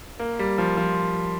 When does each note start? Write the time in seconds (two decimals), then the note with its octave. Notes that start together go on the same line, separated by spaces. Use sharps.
0.19 A#3
0.39 G3
0.58 F3
0.77 F3